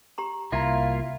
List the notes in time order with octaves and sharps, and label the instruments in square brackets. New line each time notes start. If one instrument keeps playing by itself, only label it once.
[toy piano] G4 A#5 C6
[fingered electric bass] C2 [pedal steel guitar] A#3 E4 F4 [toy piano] E5 F5 A#5